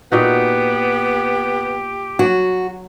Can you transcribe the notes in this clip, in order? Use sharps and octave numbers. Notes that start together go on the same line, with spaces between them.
A#2 B3 D#4 F#4 G4
F#3 F#4